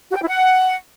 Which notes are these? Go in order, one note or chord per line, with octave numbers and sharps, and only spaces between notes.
F#4
G5
E4
F#5